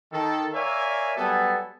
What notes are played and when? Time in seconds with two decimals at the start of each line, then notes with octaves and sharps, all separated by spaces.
0.11 D#3 A4
0.54 A#4 C#5 D5 E5 F5 G#5
1.16 F#3 G3 B3 A4 G#5 A5